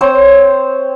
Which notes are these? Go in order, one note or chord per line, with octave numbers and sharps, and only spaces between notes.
C4 C5 C#5